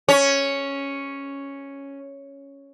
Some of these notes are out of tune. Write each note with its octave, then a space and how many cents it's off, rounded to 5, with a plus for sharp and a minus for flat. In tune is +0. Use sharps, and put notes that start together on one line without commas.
C#4 +0 C#5 +0